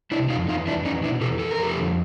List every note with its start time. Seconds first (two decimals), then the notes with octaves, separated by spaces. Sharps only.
0.11 C3 D4 E4
0.30 F2 D#4 F4
0.48 E2 D#4 F4
0.67 E2 D4 E4
0.85 E2 C#4 D#4
1.03 B2 D4 E4
1.21 E2 G4 A4
1.39 E2 A4
1.51 A#4
1.58 F2 G4 A4
1.76 D3